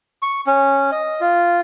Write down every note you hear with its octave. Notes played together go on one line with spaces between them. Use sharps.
C#6
C#4
D#5
F4